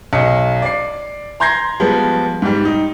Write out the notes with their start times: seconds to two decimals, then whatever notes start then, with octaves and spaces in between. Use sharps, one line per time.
0.13 B1 D#5 C#7
0.62 D5 C7
1.40 A#5 C6 G6 G#6 A#6 C7
1.80 F3 G3 G#3 B3
2.42 G#2 G3
2.65 D#4